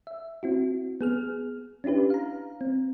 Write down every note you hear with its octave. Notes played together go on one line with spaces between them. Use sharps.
E5
C4 E4 F#4
B3 G#4 F6
C#4 D4 E4 G4 B4
F5 A#5
C4